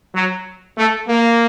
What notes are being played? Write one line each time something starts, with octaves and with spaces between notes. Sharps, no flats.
F#3
A3
A#3